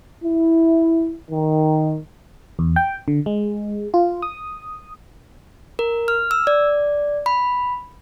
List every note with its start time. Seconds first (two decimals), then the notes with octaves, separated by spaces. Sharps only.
0.23 E4
1.30 D#3
2.59 E2
2.76 G5
3.08 D3
3.26 G#3
3.94 F4
4.22 D#6
5.79 A#4
6.08 F6
6.31 E6
6.47 D5
7.26 B5